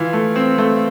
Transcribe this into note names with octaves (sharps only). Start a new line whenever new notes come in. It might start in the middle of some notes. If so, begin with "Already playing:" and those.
Already playing: E3 F4
A3
C4
A3